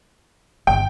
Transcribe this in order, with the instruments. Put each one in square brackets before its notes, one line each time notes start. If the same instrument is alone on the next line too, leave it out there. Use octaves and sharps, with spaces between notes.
[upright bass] G1 [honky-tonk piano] G5